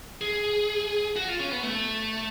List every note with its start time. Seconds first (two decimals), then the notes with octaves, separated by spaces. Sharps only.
0.21 G#4
1.16 F#4
1.28 F4
1.40 C#4
1.51 B3
1.63 A3